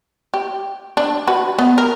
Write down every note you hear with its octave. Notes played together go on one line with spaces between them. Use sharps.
G4
D4
F#4 B4
B3
A#4